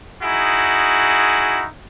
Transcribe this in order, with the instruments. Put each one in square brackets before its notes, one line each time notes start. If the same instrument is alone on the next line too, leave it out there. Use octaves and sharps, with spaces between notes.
[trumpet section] D#4 E4 F#4 G#4